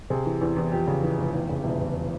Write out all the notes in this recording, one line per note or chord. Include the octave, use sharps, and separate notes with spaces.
C3 G#4
E3
E2
E2
F2 G4
C#3
E3
F1
E2
C#3
E1 E4
E1